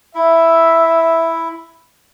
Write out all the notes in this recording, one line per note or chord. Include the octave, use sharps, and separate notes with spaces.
E4 E5